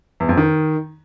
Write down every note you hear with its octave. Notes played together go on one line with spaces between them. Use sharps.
E2
F2
D#3